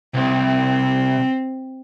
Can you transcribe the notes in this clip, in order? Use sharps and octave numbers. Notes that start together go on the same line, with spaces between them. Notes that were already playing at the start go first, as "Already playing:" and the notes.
C2 C4